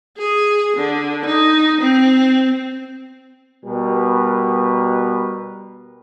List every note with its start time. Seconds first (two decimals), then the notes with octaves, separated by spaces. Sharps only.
0.18 G#4
0.77 D3
1.25 D#4
1.81 C4
3.65 B2 G3 A#4 B4